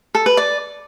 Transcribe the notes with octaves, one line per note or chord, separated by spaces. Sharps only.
A4
B4
D5